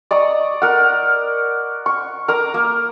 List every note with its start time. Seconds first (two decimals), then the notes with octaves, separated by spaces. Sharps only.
0.11 D5 D#5 A#5 C#6
0.62 A#4 F#5
1.86 C#6
2.28 A#4 A#5 D6
2.54 A#3